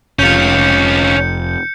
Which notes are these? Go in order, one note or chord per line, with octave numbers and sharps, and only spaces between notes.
F1 C#4 F4 G6 C#7